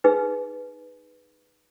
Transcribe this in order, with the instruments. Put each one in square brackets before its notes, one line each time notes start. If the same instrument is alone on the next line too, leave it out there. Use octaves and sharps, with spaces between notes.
[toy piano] D#4 G#4 B4